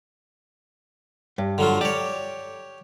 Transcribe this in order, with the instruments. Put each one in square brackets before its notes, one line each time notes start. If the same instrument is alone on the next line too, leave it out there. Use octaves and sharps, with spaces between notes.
[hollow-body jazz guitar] G2
[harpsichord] D3 F#3 F4
[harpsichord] G4 C#5 [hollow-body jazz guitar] D5